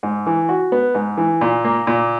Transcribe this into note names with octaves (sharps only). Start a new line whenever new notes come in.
G#2
E3
F#4
B3
G#2
E3
A#2
A#3
A#2